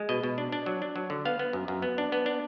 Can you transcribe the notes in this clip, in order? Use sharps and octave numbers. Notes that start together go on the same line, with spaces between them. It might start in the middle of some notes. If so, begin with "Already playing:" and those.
Already playing: G#3
B2 D#5
B2
D4
D4
F#3
D4
F#3
D3
B3 F5
B3
F#2
F#2
B3
D4
B3
D4